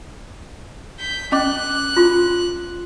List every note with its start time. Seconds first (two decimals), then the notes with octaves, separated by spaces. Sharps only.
0.99 G6 B6
1.32 C#4 D#5 D6 F#6
1.97 F4 C6